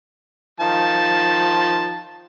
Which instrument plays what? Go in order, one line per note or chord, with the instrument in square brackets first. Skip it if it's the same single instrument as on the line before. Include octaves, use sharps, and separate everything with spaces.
[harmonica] D#3 F3 A5